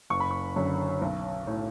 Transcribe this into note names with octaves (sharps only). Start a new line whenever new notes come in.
F#1 C#6
B5
C#6
F#2 D3
B1
A2